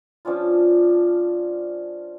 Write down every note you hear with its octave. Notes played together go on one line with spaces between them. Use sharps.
F3 C#4 D4 F4